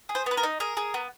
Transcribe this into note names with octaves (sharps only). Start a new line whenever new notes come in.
G#4
C5
B3 B4
A#4
D#4
G#4 A#4
G#4
B3